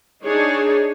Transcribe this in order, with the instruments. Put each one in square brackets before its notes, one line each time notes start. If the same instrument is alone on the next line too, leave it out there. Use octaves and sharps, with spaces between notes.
[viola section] D4 D#4 G#4 C#5